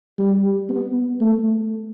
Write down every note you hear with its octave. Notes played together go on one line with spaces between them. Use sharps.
G3
B3
A3